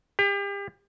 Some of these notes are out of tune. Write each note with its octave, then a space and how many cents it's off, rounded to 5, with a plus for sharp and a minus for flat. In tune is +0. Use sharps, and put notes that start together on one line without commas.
G4 +35